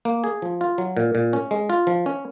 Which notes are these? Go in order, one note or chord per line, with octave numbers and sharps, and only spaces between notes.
A#3
G#4
F3
F4
F#3
A#2
A#2
C#4
G#3
F4
F3
C#4